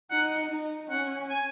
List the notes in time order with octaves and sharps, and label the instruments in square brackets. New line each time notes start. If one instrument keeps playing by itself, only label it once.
[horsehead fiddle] D#4 [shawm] F#5
[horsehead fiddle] D#4
[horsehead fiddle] C#4 [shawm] F#5
[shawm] G#5